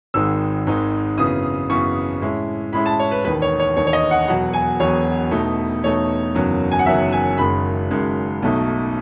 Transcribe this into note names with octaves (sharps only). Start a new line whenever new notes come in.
G#1 G#2 D#3 G#3 D#4 E6
G#1 G#2 D#3 G#3 D#4
F#2 C#3 E3 B3 D#6
F#2 C#3 E3 B3 C#6
A2 G#3 C#4 E4
A2 G#3 C#4 E4 B5
A5
C#5
B4
E1 D#2 D#3 B4
C#5
C#5
E1 D#2 D#3 C#5
C#5
D#5
F#5
E1 E2 B2 F#3 F#5
G#5
E1 E2 B2 F#3 C#5
E2 B2 A3 D#4
E2 B2 A3 D#4 C#5
F#1 E2 D#3 F#3 C#4
G#5
F#5
F#1 E2 D#3 F#3 C#4 E5
G#5
F#1 F#2 D#3 G#3 B5
F#1 F#2 D#3 G#3
B1 B2 F#3 A3 D#4